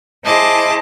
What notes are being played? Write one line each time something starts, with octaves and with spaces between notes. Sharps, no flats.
E4 G#4 C5 D#5 A5 D6